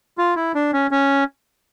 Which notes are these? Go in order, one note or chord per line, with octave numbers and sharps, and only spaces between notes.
F4
E4
D4
C#4
C#4